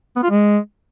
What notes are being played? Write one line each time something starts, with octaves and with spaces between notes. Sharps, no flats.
B3
F4
G#3